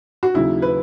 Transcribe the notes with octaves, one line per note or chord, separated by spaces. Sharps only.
F#4
D#2 C#3 F#3 E4
B4